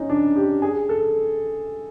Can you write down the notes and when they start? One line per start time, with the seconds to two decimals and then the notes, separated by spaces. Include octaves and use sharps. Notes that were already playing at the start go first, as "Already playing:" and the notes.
Already playing: C#4 D#4
0.10 D4
0.36 G4
0.62 G#4
0.89 A4